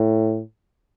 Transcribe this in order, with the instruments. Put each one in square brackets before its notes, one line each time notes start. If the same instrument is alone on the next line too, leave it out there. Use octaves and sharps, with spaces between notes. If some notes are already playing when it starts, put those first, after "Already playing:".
Already playing: [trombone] A2